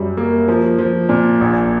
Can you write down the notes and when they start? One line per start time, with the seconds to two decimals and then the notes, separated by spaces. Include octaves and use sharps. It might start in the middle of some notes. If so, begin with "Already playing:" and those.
Already playing: F#2 G3
0.17 A#3
0.48 F3
0.78 F3
1.09 A#2
1.41 A#1